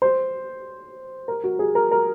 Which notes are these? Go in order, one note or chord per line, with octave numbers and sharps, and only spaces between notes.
C5
A#4
F#4
G#4
A#4
A#4